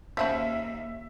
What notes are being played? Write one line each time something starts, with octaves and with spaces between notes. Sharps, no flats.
D#2 C#3 F3 A#3 F#4 E5